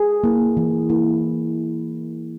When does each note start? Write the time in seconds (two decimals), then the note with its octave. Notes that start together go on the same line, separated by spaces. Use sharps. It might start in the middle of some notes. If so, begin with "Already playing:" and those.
Already playing: G#4
0.24 A#3 E4
0.57 E3
0.89 A#3 E4